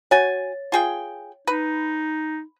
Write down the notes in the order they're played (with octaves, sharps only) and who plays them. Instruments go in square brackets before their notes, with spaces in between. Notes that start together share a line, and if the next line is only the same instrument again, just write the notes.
[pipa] F#4 G#5 [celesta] C#5 A6
[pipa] F4 G#4 G5
[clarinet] D#4 [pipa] B4